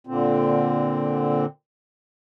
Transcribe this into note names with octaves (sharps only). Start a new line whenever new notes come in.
A#2 D3 C4